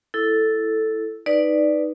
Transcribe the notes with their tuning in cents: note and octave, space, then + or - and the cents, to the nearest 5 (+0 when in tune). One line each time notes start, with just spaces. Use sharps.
E4 +0 A4 +0
D#4 +0 B4 +0 D5 +0